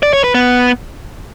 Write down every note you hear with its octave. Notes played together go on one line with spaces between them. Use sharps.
D5
C#5
B4
B3